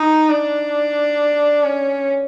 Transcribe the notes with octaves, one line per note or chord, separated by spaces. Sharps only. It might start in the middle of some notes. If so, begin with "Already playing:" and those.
Already playing: D#4
D4
C#4